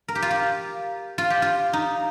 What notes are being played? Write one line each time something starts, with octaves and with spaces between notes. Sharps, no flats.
A#4
G4
F4
G4
F4
G4
F4
D#4